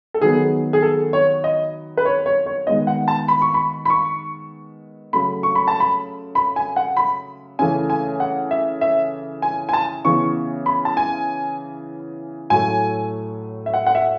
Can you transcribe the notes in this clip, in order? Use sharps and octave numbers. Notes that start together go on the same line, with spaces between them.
A4
D#3 F#3 B3 G#4
G#4
A4
C#5
D#5
B4
C#5
C#5
C#5
D#3 G#3 B3 D#5
F#5
A5
B5
C#6
B5
B5
C#6
C#3 F#3 A3 B5
C#6
B5
A5
B5
B5
G#5
F#5
B5
C#3 E3 A3 G#5
G#5
F#5
E5
E5
G#5
G#5
A5
C#3 E3 B3 C#6
B5
A5
G#5
A2 F#3 A3 G#5
E5
F#5
F#5
E5